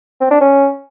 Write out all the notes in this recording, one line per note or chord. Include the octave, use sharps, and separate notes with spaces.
C4
D4
C#4